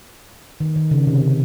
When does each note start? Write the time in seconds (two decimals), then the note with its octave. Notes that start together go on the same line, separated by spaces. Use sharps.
0.60 D#3
0.76 D#3
0.91 C#3
1.07 C3
1.22 C#3